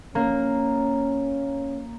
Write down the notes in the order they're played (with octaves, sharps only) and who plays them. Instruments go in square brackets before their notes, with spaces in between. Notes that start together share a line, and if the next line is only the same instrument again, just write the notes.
[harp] A#3 [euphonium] C#4